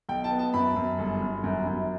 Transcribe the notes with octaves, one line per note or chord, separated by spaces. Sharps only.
B1 G5
A5
B3
A5
F#2 B5
F#2
G1
G1
F#2
F#2